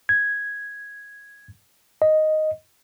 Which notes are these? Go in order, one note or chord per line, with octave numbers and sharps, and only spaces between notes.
G#6
D#5